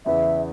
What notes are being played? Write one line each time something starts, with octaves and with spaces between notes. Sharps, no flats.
E2 C#3 E3 B3 E5